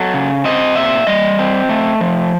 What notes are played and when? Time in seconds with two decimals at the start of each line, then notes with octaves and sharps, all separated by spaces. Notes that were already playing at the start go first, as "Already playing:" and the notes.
Already playing: F#3 A4
0.14 C#3
0.44 C4 D#5
0.76 A#2 E5
1.07 G3 D#5
1.39 C4
1.69 A3
2.01 F3